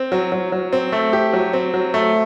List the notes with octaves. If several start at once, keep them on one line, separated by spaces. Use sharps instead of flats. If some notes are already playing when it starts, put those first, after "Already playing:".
Already playing: C4
F#3
F#3
F#3
C4
A3
G4
F#3
C4
F#3
A3